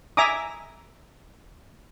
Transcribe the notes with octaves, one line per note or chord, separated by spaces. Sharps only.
E5 G#5 A#5 D6 D#6